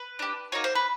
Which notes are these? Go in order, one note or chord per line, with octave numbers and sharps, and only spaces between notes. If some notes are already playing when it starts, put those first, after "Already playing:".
Already playing: B4
D4 G4
A#3 D#4 F#4 C#5
C5
B4